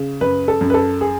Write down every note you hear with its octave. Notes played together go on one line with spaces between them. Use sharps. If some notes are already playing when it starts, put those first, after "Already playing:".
Already playing: C#3
F#2 B4
A4
F#2
B4
A4
G#4